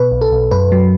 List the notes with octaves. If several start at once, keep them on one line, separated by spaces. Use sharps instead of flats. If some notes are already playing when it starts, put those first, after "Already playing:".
Already playing: B2 B4
B1
A4
B1
F#2 B4
F#3